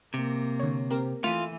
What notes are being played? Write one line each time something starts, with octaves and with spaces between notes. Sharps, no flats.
C3 A#3
D3 C#5
C4 G4 A#4
E3 A3 F4 D#7